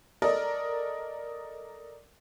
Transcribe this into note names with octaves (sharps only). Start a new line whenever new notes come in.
A4 A#4 D5 D#5